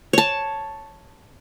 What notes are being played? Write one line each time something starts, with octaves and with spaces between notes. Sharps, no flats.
C#5 A5